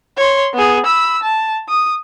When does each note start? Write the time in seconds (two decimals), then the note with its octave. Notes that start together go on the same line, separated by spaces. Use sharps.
0.17 C#5 C6
0.54 B3 G#4
0.86 B5 E6
1.23 A5
1.69 D#6